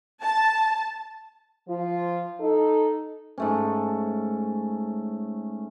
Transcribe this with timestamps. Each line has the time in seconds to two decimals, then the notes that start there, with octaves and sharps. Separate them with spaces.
0.22 A5
1.68 F3 F4
2.39 D#4 A4
3.38 G#2 A3 C#4